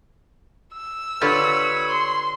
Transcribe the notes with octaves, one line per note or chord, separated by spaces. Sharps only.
E6
D3 F4 G4 B4 C#5 B5
C6